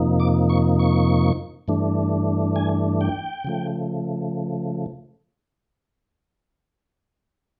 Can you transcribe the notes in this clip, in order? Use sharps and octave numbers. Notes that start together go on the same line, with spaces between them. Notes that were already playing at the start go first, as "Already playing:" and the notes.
Already playing: F2 C3 F3 A#3 D#4
D6
C#6
C#6
G2 E3 A3 D4
G#5
G5
C#3 F3 A3